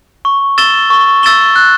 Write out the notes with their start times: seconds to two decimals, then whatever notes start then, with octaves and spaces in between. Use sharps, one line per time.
0.25 C#6
0.58 E6 A6 E7 G7
0.90 C#6
1.23 E6 A6 E7 G7
1.56 F#6